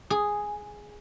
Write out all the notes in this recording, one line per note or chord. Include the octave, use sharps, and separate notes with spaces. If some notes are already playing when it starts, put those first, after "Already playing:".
G#4